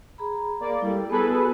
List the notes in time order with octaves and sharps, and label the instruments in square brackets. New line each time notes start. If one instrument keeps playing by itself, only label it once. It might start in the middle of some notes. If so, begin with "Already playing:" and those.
[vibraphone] G#4 A#5 B5
[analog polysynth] A#3 D5
[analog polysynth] G3 [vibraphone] E4 A4
[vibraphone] B3 F#4 [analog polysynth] G#4 A4 B4